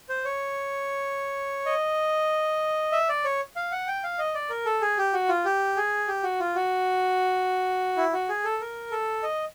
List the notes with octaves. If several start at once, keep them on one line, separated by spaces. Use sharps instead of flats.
C5
C#5
D#5
E5
D5
C#5
F5
F#5
G5
F5
D#5
D5
A#4
A4
G#4
G4
F#4
F4
G4
G#4
G4
F#4
F4
F#4
E4
F#4
G#4
A4
A#4
A4
D#5